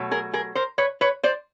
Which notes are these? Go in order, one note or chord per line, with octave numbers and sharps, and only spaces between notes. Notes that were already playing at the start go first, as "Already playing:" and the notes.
Already playing: B2 F#3 A3
G#4 A#4
G#4 A#4
A#4 C5
B4 C#5
B4 C#5
C5 D5